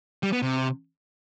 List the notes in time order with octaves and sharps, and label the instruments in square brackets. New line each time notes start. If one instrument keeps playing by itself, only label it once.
[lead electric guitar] G3
B3
C3